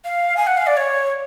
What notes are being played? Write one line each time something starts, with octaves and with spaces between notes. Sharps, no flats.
F5
G#5
F#5
F5
D5
C#5